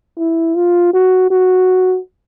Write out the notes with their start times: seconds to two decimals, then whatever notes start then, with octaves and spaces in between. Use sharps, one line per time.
0.18 E4
0.55 F4
0.93 F#4
1.30 F#4